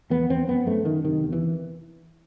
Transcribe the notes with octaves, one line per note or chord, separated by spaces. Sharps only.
E2 B3
E2 C4
F#2 B3
F#2 A3
F#2 D#3
C3 D#3
E2
E3